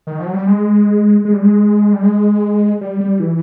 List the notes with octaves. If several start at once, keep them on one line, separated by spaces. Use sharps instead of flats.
D#3
F3
F#3
G3
G#3
G#3
G3
G#3
G3
G#3
G3
G3
E3